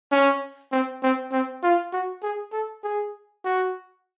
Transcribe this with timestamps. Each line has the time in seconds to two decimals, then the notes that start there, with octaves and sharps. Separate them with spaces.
0.12 C#4
0.72 C4
1.03 C4
1.32 C4
1.63 F4
1.93 F#4
2.23 G#4
2.53 A4
2.84 G#4
3.44 F#4